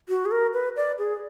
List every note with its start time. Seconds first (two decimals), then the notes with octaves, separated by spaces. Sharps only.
0.09 F#4
0.25 G#4
0.31 A#4
0.53 B4
0.76 D5
0.98 G#4